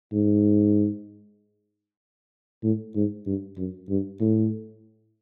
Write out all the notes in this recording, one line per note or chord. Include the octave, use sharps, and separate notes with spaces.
G#2
A2
G#2
G2
F#2
G2
A2